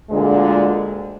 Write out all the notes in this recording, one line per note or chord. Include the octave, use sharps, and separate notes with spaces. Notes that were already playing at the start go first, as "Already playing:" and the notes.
D2 A#2 D3 G#3